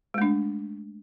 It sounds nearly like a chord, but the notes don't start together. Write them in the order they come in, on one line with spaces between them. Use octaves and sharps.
G#3 A3 D4